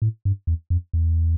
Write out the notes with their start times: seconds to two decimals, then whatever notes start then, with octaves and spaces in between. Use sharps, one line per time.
0.02 A2
0.25 G2
0.47 E2
0.70 F2
0.93 E2